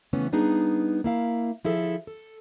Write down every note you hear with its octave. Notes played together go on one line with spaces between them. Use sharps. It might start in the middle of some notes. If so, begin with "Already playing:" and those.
C#3 E3 A3 B3 C#4
G3 B3 D4 D#4 G#4
A#3 E4 F5
F3 E4 G#4 A4
A4